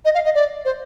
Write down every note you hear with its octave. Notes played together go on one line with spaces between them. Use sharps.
D#5
F5
D#5
D5
C5